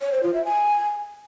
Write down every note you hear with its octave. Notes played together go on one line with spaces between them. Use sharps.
C#5
C5
F4
E5
G#5